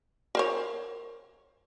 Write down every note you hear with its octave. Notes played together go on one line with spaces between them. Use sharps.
A#4 C5 C#5